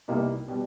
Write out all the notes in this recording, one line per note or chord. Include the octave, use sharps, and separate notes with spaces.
C2 B2 G3 A#3 D#4
B2 G3